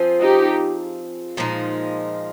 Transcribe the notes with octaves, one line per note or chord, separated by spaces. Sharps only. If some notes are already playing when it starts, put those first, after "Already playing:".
Already playing: F3 C4 F4 G#4
D#4 G4
A#2 F3 G#3 D#4